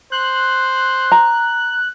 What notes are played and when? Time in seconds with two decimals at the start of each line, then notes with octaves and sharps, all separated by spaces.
0.12 C5 F#6
1.12 A#5